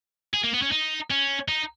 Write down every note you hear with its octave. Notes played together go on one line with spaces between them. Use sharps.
G#4
A#3
B3
C#4
D#4
C#4
D#4